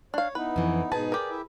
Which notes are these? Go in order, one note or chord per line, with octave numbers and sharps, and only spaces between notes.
D4 C#5 F5
B3 D#4 E4 B4
F2 E3
G#2 B2 D#4 G#4 B4 A5
G4 A#4 D5
E4 E5